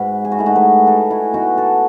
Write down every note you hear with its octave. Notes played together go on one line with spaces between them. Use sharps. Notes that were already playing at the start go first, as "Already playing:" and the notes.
Already playing: G#2 F#4 B4
G#4
F#4
A3 E4
D#4 F#4
G#4 B4
A3 F#4 A4
E4 G#4
B2 D#4 F#4
F#4 A4